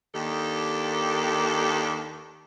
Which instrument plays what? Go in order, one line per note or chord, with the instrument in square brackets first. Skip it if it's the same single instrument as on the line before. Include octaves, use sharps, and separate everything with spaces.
[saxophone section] D#2 D#3 D4 G4 A4